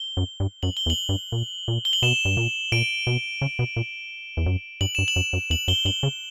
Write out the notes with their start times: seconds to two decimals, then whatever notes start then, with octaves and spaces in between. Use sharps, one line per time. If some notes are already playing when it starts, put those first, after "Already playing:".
Already playing: G7
0.17 F#2
0.40 G2
0.63 F#2 F#7
0.77 G7
0.86 E2
0.90 F#7
1.09 G2
1.32 A#2
1.68 A#2
1.85 G7
1.93 F#7
2.02 B2 E7
2.25 G2
2.37 A#2
2.72 A#2 D7
3.07 B2
3.42 C#3
3.59 B2
3.77 A#2
4.37 E2
4.46 F#2
4.81 G2 F#7
4.95 G2 E7
5.08 F#7
5.16 F#2
5.33 F#2
5.50 E2 F#7
5.68 F#2 G7
5.85 G2 F#7
6.03 C#3